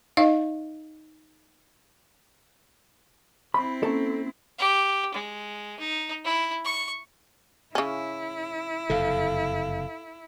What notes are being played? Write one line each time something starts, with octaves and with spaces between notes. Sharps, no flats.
D#4 D#5 F5
C4 E4 B5
A#3 C#4 A4
G4
G#3
D#4
E4
C#6
C#3 C#4 E4
F#1 F2 C3 A4 F5